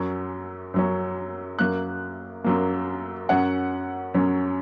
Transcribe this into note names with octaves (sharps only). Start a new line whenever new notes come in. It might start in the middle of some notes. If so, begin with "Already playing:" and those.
Already playing: F#2 F#3 C#4
F#2 F#3 C#4
F#2 F#3 A#3 F#6
F#2 F#3 A#3
F#2 F#3 C#4 F#5
F#2 F#3 C#4